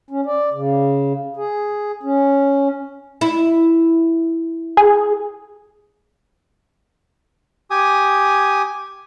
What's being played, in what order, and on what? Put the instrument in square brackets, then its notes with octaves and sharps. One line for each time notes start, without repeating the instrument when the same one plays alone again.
[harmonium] C#4
D5
C#3
G#4
C#4
[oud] E4
[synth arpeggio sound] G#4
[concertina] G4 G#5 D#6